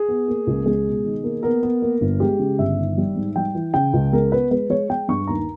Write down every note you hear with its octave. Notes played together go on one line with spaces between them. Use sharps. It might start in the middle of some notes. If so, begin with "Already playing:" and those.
Already playing: G#4
B3
A#3
C#2
G#3 G#4
B2
D#3
A#3
B3 A#4
B3
A#3
G1
G#3 G4
C#3
G1 E5
D#3
G3
G#2
G3 G5
E3
C#3 G5
C#2
G#3 A#4
B3 B4
G#3 B4
G#3 C#5
G#3 G5
G2 C#6
D#2 A#5